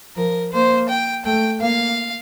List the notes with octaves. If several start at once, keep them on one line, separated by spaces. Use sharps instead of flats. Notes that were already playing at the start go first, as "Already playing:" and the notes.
F3 A#4
A#3 C5
G5
A3 G5
A#3 F5